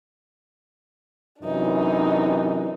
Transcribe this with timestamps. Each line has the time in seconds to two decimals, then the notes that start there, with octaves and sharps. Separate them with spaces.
1.42 F#2 C3 E3 D4 D#4